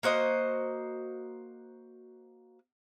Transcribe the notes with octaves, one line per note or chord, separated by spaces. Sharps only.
A#3 F#4 C5 D#5